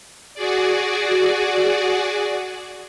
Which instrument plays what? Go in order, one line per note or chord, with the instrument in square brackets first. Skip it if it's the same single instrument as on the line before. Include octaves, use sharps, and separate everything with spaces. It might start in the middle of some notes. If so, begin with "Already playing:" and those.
[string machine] F#4 G#4 D5